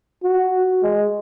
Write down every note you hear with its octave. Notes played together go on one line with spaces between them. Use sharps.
F#4
G#3